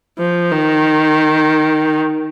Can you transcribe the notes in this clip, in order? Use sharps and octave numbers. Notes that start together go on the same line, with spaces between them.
F3
D#3